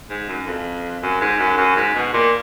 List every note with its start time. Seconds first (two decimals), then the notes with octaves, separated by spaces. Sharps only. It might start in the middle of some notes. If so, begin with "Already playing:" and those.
0.10 G#2
0.29 F#2
0.47 F2
1.03 F#2
1.21 G#2
1.39 F#2
1.57 F#2
1.76 G#2
1.95 B2
2.13 A#2